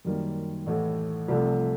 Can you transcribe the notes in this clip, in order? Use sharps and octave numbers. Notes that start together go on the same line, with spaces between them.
F#2 D#3 G3 A#3
A1 A2 E3 A3
C2 C3 F3 A3